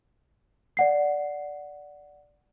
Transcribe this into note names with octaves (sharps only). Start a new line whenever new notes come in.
D5 F#5 C7